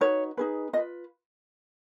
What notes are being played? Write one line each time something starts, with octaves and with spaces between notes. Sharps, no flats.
D#4 F#4 B4 C#5
D#4 G#4 B4
F4 B4 D#5